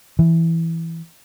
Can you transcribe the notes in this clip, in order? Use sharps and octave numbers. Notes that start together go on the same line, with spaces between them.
E3